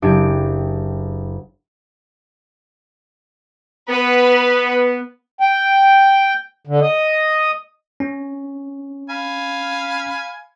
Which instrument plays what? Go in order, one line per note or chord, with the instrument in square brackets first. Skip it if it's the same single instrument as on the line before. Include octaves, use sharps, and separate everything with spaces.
[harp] F#1 D4 G4 G#5 D7
[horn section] B3 [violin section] B4
[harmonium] G5
D3
D#5
[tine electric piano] C#4
[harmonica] F5 G#5 B5